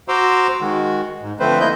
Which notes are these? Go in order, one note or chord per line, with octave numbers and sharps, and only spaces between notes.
F#4 C5 A#5 C6 D6 E6
D#3 G#3 F#4
G#2
D3 F3 A3 C4 B4 C5
A#3 E4 D#5 G6